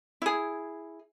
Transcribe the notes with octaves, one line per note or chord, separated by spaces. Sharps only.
E4 G#4